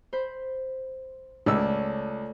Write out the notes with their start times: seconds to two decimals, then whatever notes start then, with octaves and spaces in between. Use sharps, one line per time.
0.13 C5 B5
1.46 C#2 A3 C#5 D5 E6